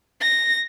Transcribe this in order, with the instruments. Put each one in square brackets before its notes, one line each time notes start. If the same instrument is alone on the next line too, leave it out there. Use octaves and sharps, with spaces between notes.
[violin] A#6